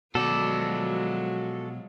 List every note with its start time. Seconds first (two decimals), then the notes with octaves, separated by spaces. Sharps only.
0.15 B2 F3 F#3 G#3 F#4 A4 D5